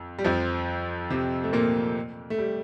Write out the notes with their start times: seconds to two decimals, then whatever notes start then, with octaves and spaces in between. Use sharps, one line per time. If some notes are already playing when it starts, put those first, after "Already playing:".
Already playing: F2
0.19 G3
0.24 F2 F3
1.10 C3 C4
1.44 A3
1.53 A#2 A#3
2.30 A3
2.39 G3